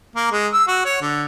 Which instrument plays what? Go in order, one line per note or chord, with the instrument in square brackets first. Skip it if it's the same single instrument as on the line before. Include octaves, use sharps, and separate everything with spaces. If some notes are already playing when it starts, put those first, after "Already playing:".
[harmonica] A#3
G#3
E6
F#4
C#5
D3